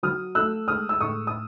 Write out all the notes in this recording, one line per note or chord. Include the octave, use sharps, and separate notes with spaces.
F#3 D#6 F6
A3 E6 F#6
G#3 D#6 F6
E6
A2 C#6 D#6
D#6